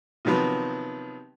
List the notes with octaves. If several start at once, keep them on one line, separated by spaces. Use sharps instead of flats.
C3 D#3 F3 F#3 B3